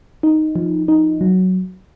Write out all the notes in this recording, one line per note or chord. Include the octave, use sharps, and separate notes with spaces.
D#4
F3
D#4
F#3